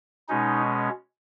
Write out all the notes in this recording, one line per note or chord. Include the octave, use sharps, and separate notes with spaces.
B2 G#3 C#4 D#4